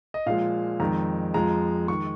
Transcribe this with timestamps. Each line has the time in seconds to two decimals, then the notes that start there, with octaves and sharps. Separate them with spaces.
0.14 D#5
0.26 A#2 F3 G#3 F5
0.80 F2 D#3 G#3 A#5
1.34 F2 F3 G#3 A#5
1.88 D#3 G#3 C#6